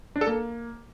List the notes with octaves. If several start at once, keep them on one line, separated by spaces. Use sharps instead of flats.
D4
A4
A#3